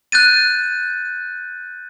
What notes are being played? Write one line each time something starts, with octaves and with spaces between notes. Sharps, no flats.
F#6 G6 A6 D#7